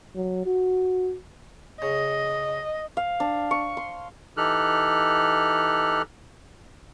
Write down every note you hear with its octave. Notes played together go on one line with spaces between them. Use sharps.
F#3
F#4
C#3 D#5
F5
D4
C#6
C6
E3 D#4 G4 A4 F6 F#6